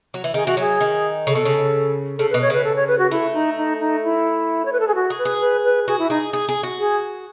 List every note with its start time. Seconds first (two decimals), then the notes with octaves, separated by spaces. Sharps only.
0.14 F#3
0.24 E3
0.34 D#3 G#4
0.46 E3 F#4
0.57 F#3 G#4
0.81 D#3
1.27 C#3 A4
1.35 B2
1.45 C#3
2.18 C#3 A4
2.30 B4
2.34 B2
2.42 C#5
2.50 C#3 B4
2.64 A4
2.76 C#5
2.88 B4
2.99 F#4
3.11 A3 E4
3.34 D#4
3.57 D#4
3.80 D#4
4.04 E4
4.65 C#5
4.73 B4
4.80 A4
4.88 G#4
4.95 F#4
5.10 G#4
5.18 B4
5.25 G#4
5.41 B4
5.64 B4
5.88 F#4 G#4
5.99 E4
6.10 D#4 G#4
6.33 G#4
6.49 G#4
6.63 F#4
6.79 G#4